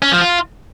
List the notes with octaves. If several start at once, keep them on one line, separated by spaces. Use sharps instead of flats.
C#4
F3
F4